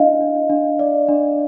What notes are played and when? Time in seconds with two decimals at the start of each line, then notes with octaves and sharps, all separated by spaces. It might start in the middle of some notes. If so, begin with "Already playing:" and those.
Already playing: D4 E4 D#5 F5
0.21 D4
0.50 D4
0.79 D5
1.09 D4